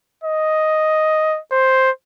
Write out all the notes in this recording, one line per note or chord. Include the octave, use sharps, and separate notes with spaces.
D#5
C5